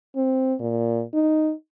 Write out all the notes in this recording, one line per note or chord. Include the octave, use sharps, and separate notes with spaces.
C4
A#2
D#4